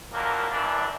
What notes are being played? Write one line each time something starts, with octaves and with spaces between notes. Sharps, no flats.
F2 E3 F#3 A#3 D4 A#4
F#2 E3 D4